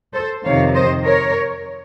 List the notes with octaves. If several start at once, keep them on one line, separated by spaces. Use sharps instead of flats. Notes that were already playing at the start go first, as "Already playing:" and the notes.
A4 C5
F2 C3 D#3 C#5 F5
C5 D#5
A#4 C#5